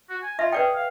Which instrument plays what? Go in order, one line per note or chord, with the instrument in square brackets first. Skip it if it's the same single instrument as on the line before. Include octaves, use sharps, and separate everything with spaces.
[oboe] F#4
G#5
[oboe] F4 [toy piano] E5
[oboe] G#4 [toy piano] B4 D5 G5
[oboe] F5